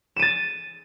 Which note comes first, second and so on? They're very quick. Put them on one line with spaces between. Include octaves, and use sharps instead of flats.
E7 D#7 A6